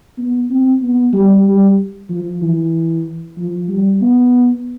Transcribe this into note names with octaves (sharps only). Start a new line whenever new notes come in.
B3
C4
B3
G3
G3
F3
E3
F3
G3
B3